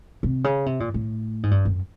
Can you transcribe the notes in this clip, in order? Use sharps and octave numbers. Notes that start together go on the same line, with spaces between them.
C3
C#3
C3
A#2
A2
G#2
G2
F#2